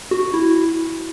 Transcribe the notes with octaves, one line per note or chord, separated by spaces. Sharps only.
F#4
E4